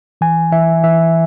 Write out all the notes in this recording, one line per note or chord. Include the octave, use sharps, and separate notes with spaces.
E3 G#5
E3 E5
E3 E5